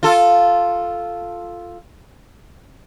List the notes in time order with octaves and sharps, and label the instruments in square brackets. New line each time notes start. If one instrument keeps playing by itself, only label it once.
[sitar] F4 A4